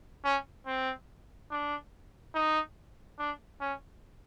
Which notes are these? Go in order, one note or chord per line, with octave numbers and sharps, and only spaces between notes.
C#4
C4
D4
D#4
D4
C#4